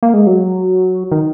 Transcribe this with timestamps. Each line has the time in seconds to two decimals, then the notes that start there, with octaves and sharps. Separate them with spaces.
0.03 A#3
0.14 G#3
0.27 F#3
1.12 D#3